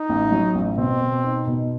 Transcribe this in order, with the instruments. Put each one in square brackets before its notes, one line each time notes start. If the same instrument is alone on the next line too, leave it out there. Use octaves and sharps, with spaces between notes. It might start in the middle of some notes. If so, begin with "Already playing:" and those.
Already playing: [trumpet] D#4
[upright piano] A1
F#3
A1
[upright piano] B2 [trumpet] C4
[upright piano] B2
D#4
B2